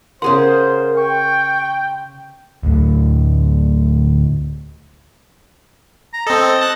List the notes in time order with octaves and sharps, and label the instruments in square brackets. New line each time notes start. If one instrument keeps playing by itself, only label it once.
[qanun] C#3 G#4 F#5 [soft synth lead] A#4 [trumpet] C5 [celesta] C6
[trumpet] G5 [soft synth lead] C#6
[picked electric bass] D2 A2 D3
[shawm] A#5
[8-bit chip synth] C4 A4 [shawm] D#5
[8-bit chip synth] A5 F#6